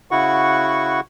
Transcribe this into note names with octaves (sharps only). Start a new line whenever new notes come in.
C#3 E4 F#4 F#5 C#6